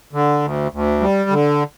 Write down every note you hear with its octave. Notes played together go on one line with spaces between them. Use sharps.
D3
D2
D2
G3
D3